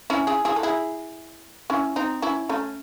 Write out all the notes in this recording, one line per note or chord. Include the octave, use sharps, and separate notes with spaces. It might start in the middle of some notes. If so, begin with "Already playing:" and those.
C#4 E4
E4 G#4
E4 G#4
A4
E4 G#4
C#4 E4
C4 D#4
C#4 E4
A3 C#4